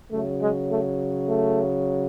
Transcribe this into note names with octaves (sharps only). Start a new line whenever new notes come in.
C#3 F#3 A3
G#3
A3
A3